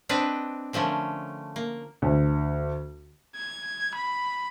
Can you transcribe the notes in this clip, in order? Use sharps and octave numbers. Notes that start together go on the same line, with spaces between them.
C4 D4 B4 D#5
D3 F3 A3 C#4 A#4
A#3
D2
G#6
B5